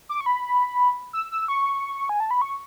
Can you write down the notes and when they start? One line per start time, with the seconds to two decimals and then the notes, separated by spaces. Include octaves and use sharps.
0.09 D6
0.21 C#6
0.26 B5
1.13 E6
1.31 E6
1.48 C#6
2.09 G#5
2.20 A5
2.31 B5
2.42 C#6